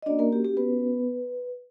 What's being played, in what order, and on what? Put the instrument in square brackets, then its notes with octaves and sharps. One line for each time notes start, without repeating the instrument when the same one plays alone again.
[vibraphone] D#5
A#3 C#4 D4 F#4 D5
A#3 A#4
G4
G4
B3 B4